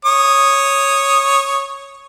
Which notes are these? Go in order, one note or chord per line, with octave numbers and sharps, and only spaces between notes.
C#5 D#6